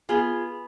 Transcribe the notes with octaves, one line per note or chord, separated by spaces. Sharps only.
B3 F4 G#4